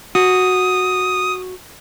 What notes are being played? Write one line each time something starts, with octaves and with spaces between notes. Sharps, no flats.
F#4 D#6